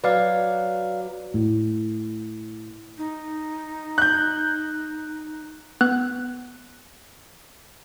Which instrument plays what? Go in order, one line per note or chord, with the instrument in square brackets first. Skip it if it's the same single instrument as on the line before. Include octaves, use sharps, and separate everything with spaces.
[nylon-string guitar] F#3 [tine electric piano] B4 D5 F5
[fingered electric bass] A2
[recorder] D#4
[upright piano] F#6 G6
[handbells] B3 F#6